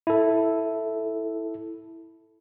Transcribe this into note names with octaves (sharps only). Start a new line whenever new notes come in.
E4 A4